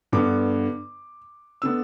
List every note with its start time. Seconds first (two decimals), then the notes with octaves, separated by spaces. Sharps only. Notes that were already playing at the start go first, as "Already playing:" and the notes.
0.12 G2 D3 B3 D6
1.62 D3 B3 D4 E6